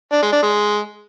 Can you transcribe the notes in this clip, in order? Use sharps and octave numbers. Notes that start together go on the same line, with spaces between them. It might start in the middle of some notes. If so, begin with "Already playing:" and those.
D4
G#3
D4
G#3